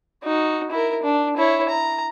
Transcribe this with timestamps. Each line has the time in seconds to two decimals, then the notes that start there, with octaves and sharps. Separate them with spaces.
0.24 D#4 F#4
0.71 E4 A#4
1.03 D4
1.37 E4 C#5
1.69 A#5